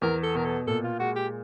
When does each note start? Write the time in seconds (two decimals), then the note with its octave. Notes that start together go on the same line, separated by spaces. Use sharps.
0.02 E2 A#4
0.23 A4
0.35 B2 A#4
0.45 A4
0.67 A#2 A4
0.84 F4
0.99 G#3 F#4
1.16 G4